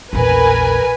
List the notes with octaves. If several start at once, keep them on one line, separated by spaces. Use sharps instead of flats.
A#1 E2 A#4 B4 G#5